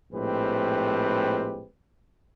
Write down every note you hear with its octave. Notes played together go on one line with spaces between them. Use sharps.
A#1 A2 G#3 C4 G4 B4